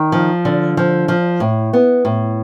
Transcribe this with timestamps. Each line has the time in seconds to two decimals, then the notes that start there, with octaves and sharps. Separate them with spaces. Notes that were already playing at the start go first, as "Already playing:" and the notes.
Already playing: D#3
0.12 F3
0.45 D3
0.77 F3
1.08 F3
1.40 A2
1.73 B3
2.05 A2